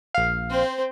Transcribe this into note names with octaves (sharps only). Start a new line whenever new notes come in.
A#1 F5
C4 C5